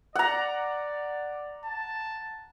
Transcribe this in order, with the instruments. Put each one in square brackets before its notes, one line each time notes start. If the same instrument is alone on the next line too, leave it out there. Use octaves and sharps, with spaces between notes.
[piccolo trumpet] D5 [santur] F#5 A#5
[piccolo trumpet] A5